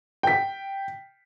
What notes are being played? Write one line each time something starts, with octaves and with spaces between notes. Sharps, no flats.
G5 B6